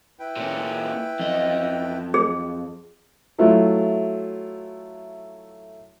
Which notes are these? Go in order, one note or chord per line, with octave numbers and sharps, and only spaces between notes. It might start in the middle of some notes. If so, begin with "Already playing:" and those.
E4 B4 G5
A#2 C#4
F2 D#5
G#4
F#3 A3 E4 F4